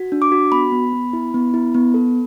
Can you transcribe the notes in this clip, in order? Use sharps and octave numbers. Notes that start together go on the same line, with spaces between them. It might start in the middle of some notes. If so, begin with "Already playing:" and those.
Already playing: F#4
D4
D6
F#4
B3 B5
B3
B3
E4
B3
E4
B3
A4